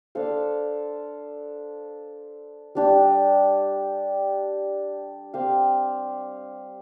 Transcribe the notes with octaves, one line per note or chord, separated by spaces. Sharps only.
D4 A4 C5 F5
G3 D4 G4
C4 G4 C5 F5